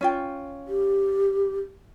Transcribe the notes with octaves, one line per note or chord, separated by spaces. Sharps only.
C#4 F4 G5
G4